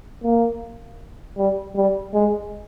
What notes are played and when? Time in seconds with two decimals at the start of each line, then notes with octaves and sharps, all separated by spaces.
0.24 A#3
1.37 G3
1.76 G3
2.14 G#3